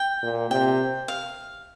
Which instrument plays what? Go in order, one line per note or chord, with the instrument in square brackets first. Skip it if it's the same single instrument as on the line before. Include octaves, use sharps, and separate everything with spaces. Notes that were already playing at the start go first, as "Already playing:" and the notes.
Already playing: [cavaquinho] G5
[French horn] A#2
[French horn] C3 [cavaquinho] G5
[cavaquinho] F5